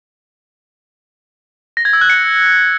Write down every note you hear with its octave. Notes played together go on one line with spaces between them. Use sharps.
A#6
G#6
E6
F#6
C#7